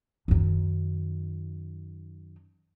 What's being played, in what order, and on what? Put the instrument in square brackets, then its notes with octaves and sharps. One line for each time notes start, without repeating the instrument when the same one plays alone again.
[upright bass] F#2 D#3